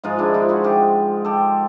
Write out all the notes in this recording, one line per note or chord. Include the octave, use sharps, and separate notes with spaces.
G#2 F3 G#3 D#4 F4
D4 E4
D#4 F4
E4 F#4
F4 G4
G4 A4